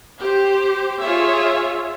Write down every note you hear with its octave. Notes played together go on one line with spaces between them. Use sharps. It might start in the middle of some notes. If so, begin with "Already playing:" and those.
G4 C5
F4 G#4 C#5 E5